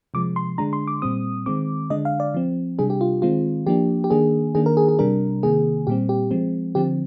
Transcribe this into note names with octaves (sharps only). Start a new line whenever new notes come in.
C3 F3 G#3 D6
C6
D3 G#3 D4 A#5
C6
D6
A#2 G3 C4 D#6
D#3 G#3 C4 D6
D3 G#3 D4 D#5
F5
D5
F3 C4
C3 G3 D4 G#4
G4
F4
D#3 G#3 C4 F4
F3 A#3 D4 G4
G4
D#3 A#3 D4 G#4
D#3 A#3 D4 G#4
A#4
G#4
G#4
C3 G3 D4 A#4
C3 D#3 A#3 G#4
A#2 G3 C4 G4
G4
F3 G#3 C4
D3 F3 C4 G4